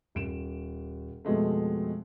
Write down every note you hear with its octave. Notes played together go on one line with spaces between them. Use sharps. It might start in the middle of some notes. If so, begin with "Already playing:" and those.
D#1 D7 E7
F2 B2 G#3 A3